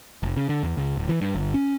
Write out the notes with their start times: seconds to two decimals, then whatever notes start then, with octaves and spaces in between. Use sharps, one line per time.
0.23 F1
0.37 C#3
0.49 D3
0.63 E2
0.77 C#2
0.97 D1
1.09 E3
1.21 G2
1.35 G1
1.54 C#4